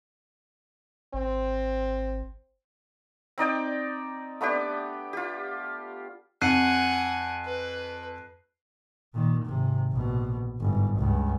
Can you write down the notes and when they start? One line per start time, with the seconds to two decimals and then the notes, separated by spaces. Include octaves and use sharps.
1.14 G#1 C4
3.38 C4 D#4 D5 G5
4.41 A3 B3 D4 G4
5.13 F4 G4
6.42 F2 F#5 G#5 F#6 C7 D#7
7.46 B4
9.14 A#2 D#3
9.45 G#1 C3
9.92 A#1 B2
10.60 G1 G#2
10.98 C#2 G2